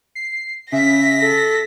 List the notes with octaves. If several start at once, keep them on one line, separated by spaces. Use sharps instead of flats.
C7
C#3 E5 A#6 B6
A4